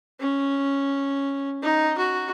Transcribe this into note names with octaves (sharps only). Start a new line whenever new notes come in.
C#4
D#4
F#4